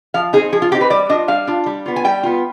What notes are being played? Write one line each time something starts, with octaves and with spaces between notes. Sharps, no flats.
F3 F5
C4 D#4 G#4
F3 G#4
F4
C4 D#4 G4
B4
G3 D5
D4 F4 D#5
G3 F5
D4 F4
G3
B3 F4
G#5
G3 G5
B3 F4